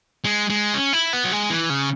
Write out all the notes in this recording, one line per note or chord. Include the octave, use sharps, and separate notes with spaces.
G#3
G#3
C#4
E4
B3
F#3
G#3
E3
C#3